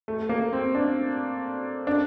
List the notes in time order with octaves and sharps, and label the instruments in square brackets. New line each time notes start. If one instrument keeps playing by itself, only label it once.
[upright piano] A3
A#3
C4
D4
D4